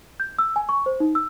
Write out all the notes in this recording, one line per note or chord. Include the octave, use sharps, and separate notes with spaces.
G6
E6
G#5
C#6
C5
D#4
E6